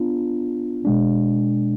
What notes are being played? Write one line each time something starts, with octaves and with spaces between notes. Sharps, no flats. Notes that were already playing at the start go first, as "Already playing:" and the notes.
Already playing: B3 D4 F4
B2 G#3 D4